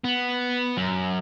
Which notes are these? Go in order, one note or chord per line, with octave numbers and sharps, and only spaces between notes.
B3
F#2